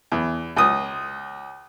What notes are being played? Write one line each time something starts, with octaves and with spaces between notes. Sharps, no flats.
E2
C#2 D#6